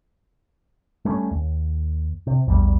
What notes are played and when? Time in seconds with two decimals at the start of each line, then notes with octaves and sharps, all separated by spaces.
1.05 G3 A3 B3 C#4
1.31 D#2
2.27 C3
2.47 A#1 E2 E3 G3